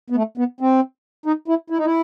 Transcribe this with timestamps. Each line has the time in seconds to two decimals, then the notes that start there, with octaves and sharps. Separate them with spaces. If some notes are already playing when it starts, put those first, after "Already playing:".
0.10 B3
0.16 A3
0.37 B3
0.61 C4
1.26 D#4
1.48 E4
1.70 E4
1.78 D#4
1.85 E4